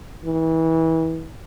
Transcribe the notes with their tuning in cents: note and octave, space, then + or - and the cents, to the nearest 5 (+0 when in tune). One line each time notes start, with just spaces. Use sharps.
E3 -30